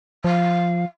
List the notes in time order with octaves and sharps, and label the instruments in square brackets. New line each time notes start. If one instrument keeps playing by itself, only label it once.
[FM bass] F3 [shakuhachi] F5